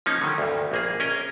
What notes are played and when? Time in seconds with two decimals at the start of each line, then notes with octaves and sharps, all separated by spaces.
0.06 F3 A#3 C#4 D#4
0.22 D3 D#3 G3
0.38 D2 G2
0.72 A#1 A#3 G#4
1.00 C#4 A#4 D#5